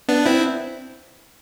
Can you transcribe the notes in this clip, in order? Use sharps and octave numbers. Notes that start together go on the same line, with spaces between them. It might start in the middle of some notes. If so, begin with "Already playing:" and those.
B3 D4
C4 E4